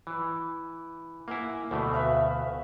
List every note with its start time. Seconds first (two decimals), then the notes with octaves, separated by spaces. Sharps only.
0.07 E3
1.28 A#3 E4 F#5 G#5
1.71 D2 B2 A3
1.93 B4 E5 F5